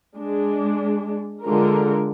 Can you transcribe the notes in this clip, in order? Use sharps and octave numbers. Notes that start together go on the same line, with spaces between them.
G#3 D4
D3 G#3 F4 A#4